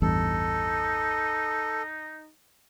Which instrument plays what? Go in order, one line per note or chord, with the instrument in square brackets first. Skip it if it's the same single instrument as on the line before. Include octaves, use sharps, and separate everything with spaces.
[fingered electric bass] A1 E2 G2 [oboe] D#4 [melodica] A4